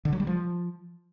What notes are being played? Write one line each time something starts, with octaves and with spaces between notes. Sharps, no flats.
D3
F#3
G3
F3